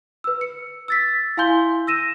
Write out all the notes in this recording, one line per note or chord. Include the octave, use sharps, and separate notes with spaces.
B4 E6
C#7
E6 A6 B6
E4 F5 G#5 C6 G6 G7
E6 A#6 D#7 E7